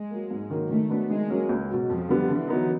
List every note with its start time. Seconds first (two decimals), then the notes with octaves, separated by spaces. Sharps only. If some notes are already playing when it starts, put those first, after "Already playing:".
Already playing: G#3
0.10 F#3 A#3
0.31 G#2
0.50 D#3 F#3 A#3
0.70 D#3 A3
0.90 F#3 B3 D4
1.09 D#3 G#3
1.30 F#3 A#3 C#4
1.49 C#2
1.69 B2 F#3
1.89 F2 F3
2.09 D3 G3 B3
2.29 D3 E3
2.48 F#3 B3 D#4